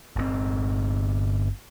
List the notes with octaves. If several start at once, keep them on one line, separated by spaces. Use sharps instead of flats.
G1 A#2 C4